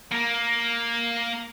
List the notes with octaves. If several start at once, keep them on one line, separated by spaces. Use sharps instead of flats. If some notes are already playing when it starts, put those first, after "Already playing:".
A#3